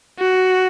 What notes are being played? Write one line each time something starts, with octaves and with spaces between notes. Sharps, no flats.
F#4